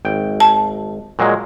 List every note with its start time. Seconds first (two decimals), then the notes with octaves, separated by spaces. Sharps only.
0.05 G#1 G5
0.40 A5
1.19 A#2 F#3 G#3